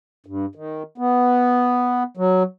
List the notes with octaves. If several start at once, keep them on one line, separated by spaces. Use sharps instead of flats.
G2
D#3
B3
F#3